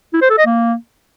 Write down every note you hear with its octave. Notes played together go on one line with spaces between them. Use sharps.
E4
C5
A4
D#5
A#3